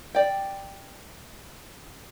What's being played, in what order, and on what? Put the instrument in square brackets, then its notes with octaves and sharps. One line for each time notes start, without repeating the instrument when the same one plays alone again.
[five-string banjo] D5 G5